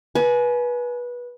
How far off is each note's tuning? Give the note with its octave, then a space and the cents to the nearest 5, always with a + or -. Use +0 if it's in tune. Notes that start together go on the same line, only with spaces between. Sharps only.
B4 -20 G#5 +30